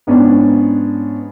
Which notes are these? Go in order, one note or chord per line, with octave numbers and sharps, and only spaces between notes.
G#2 B3 C#4 D4